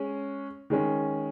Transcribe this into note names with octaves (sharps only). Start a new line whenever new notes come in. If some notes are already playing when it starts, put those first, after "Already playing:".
Already playing: G#3 C#4
D#3 G#3 C#4